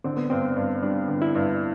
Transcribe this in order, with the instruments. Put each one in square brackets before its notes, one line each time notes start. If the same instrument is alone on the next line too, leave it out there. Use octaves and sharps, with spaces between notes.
[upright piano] D3 [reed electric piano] C4
[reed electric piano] B3
[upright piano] G2 [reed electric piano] C4
[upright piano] G2
[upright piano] G3 [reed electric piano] D4
[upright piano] D3
[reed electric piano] E4
[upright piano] G2